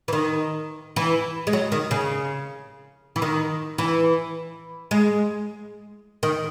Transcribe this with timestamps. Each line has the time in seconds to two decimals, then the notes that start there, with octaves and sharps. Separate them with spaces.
0.08 E3
0.13 D#3
0.96 E3
1.47 G#3
1.53 F#3
1.72 D#3
1.91 C#3
3.16 E3
3.22 D#3
3.78 E3
4.91 G#3
6.23 D#3